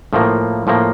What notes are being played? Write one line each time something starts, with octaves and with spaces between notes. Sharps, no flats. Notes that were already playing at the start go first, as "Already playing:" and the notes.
A2 F3 A#3
A2 F3 A#3